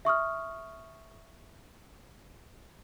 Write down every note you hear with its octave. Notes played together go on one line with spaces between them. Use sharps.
E5 C#6 D#6 F6